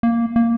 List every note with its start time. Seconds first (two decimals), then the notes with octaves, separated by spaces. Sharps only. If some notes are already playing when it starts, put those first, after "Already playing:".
0.03 A#3
0.36 A#3